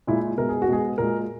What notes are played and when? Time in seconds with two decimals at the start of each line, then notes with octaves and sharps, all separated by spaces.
0.07 A#2 G#3 E4
0.37 B2 G#3 A#4
0.49 G#4
0.62 F#4
0.68 B2 G#3 G#4
0.98 A#2 G#3 A#4